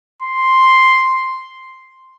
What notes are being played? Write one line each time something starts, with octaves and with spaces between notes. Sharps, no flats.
C6